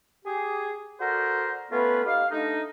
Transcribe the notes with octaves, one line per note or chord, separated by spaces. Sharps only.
G4 G#4
F#4 A4 A#4 C5 D5
A3 B3 C#4 F4 B4
D#4 G4 F5
A3 D4 D#4